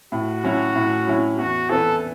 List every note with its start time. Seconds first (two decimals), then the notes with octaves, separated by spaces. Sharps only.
0.12 A2 F#4
0.44 F#3 C#4 E4
0.75 A2
1.07 F#3 C#4 E4
1.38 E2 F#4
1.69 E3 B3 E4 A4